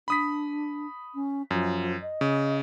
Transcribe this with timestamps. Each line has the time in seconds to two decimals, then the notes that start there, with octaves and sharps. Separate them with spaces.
0.08 D4 B5 D#6 B6
1.14 C#4
1.51 F#2 F3
2.01 D#5
2.21 C#3